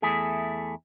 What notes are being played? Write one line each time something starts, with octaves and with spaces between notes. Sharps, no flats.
E2 A3 E4 G#4